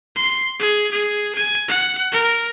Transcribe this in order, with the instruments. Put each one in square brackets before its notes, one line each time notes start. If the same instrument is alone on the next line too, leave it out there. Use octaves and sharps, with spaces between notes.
[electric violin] C6
G#4
G#4
G#5
F#5
A#4